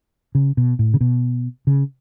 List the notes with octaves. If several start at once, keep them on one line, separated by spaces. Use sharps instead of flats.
C#3
B2
A2
C#3
B2
C#3